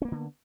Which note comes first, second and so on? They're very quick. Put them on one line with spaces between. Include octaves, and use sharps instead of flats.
C#4 A#3 B3 D3